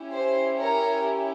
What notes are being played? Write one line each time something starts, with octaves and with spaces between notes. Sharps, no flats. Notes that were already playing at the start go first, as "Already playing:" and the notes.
Already playing: C#4 E4 G4
C5
A#4 C#5